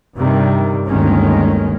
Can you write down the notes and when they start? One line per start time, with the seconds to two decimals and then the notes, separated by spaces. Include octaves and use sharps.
0.16 G2 C3 D#3 G3
0.87 G1 D2 D#3 G#3 A#3 C#4